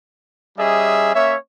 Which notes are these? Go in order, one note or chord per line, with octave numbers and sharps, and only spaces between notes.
G3 C#4 G#4 D#5 E5
A#3 C#4 C#5 E5